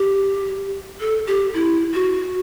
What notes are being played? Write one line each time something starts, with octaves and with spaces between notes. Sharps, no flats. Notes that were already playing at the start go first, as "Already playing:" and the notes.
Already playing: G4
A4
G4
E4
F#4